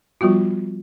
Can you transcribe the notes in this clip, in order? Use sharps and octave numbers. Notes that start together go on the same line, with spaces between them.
F3 G3 B3 F4 F#4